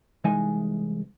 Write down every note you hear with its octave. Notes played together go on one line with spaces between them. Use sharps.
C2 E3 G#3 D#4 D#5 G#5